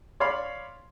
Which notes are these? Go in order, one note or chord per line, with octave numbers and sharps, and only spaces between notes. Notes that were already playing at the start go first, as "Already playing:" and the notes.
C#5 D5 F5 B5 C6